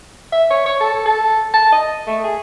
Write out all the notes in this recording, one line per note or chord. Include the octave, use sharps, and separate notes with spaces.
E5
C#5
C#5
A4
A4
A5
D#5
A3
G#4